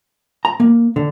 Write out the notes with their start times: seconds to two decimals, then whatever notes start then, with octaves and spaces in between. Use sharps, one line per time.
0.45 A#5
0.60 A#3
0.96 D3